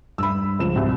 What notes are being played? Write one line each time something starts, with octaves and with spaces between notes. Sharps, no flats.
G2 B5 E6
C#2 F3 E7
C2 B2